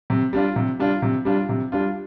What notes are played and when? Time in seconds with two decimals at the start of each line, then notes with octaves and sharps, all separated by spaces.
0.10 C3
0.33 G3 D4 F4
0.56 C3
0.79 G3 D4 F4
1.02 C3
1.25 G3 D4 F4
1.49 C3
1.72 G3 D4 F4